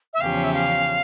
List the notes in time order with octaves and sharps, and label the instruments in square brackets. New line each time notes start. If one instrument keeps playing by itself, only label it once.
[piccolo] E5
[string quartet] E2 C#3 F3 C#4 G4 [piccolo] F5
[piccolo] E5
F5